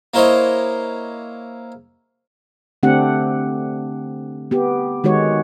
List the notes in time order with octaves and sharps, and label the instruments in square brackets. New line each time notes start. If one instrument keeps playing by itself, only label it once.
[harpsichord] A#3 E4 C5 C#5 D#5
[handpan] D3 A3 C4 D4 G4 F#5
B3 G4
D#3 G#3 F#4 C#5